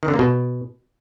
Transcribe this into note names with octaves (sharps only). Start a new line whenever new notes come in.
D#3
D3
A#3
B2